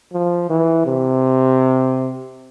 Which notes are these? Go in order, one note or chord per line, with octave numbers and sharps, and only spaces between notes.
F3
E3
C3